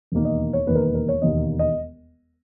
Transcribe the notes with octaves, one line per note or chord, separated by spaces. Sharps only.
E1 D#2 D#3 A#3
D#5
C#5
E1 D#2 D#3 A#3 B4
A#4
B4
A#4
C#5
E1 D#2 D#3 A#3 D#5
D#5